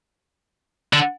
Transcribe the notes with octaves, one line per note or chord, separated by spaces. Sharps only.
D3